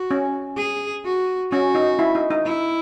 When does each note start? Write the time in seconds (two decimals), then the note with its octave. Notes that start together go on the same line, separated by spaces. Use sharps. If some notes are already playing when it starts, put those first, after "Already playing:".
Already playing: F#4
0.11 C#4
0.57 G#4
1.05 F#4
1.51 C#4 F#4
1.75 D#4
1.99 E4
2.15 D#4
2.31 D#4
2.46 E4